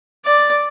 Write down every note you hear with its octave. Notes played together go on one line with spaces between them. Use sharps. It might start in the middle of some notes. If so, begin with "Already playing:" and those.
D5